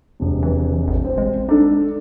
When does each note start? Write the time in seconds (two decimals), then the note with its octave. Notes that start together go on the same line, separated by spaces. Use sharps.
0.20 E1 C3
0.43 E3
0.88 A1
1.05 C4 C5
1.18 G#3
1.49 D4 D#4 A4